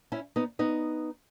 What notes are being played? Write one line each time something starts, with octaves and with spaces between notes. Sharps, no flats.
C#4 E4
B3 D#4
B3 D#4